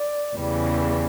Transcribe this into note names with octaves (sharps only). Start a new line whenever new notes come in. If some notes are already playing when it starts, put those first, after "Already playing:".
Already playing: D5
E2 C#3 E3 G3